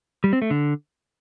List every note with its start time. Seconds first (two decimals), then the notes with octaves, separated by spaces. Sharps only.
0.24 G3
0.33 C4
0.42 A3
0.51 D3